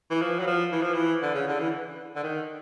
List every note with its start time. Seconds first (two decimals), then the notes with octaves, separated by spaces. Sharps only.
0.10 E3
0.21 F3
0.40 F#3
0.47 F3
0.72 E3
0.82 F3
0.94 E3
1.22 D3
1.34 C#3
1.48 D3
1.60 E3
2.16 D3
2.23 D#3